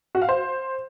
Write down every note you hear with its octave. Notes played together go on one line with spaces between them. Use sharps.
F#4
F5
C5